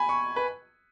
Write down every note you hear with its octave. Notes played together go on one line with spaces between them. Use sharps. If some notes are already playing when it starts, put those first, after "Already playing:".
Already playing: G#5 B5
C#6
B4